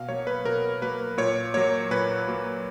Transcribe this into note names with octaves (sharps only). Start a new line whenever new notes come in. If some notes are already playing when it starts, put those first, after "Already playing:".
Already playing: B2 F5
F#3 A#3 C#5
B4
B2 A#4
F#3 A#3 B4
A#2 C#5
F#3 A#3 C#5
A#2 B4
F#3 A#3